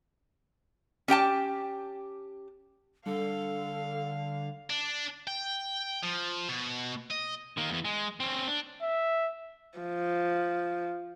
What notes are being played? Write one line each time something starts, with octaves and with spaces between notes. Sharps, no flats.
C#4 G4 G5 A5
D3 G3 A4 F5
D4
G5
F3
B2
D#5
D#3 A#3
E2 E3
G#3
C4 C#4
D4
E5
F3